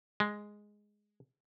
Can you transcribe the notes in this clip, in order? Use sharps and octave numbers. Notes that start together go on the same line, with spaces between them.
G#3